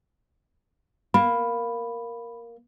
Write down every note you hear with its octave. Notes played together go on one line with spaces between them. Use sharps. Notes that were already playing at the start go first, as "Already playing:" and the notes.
A#3 B5